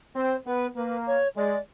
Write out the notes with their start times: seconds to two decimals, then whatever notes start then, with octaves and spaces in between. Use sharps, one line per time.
0.15 C4 C5
0.46 B3 B4
0.76 A#3 B4
1.06 C#5
1.37 G#3 D5